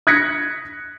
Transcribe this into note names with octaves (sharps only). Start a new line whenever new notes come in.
D#6 F#6 G#6 A#6 B6 C#7